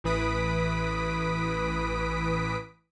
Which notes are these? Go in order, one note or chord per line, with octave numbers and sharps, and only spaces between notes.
A1 E3 B4 D#6 B6 D7